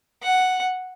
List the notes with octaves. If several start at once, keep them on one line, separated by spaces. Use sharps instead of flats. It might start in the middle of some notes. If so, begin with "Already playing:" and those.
F#5